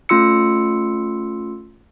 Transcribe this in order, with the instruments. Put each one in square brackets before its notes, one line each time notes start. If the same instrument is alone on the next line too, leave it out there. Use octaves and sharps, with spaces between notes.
[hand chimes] A3 C#4 F4 C6 E6 C#7